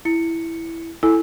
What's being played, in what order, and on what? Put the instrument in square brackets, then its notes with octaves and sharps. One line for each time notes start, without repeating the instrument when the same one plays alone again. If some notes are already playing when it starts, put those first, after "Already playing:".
[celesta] E4 C#7
[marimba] E4 [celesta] A4 G#5